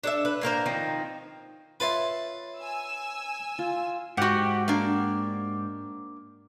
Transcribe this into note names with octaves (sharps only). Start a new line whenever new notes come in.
D4 A4 E5
B4
A2 A#3 A#4 C5
D#3 F3 C4 D#4
F4 B4 C#5 E5 A5 C6
G#5 E6
F4
G#2 F#4 G4 F#5
A#3 D4